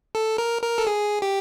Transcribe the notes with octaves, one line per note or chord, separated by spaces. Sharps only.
A4
A#4
A#4
A4
G#4
G4